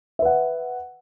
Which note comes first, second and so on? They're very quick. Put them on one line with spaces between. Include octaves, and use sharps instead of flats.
E5 B4 F#5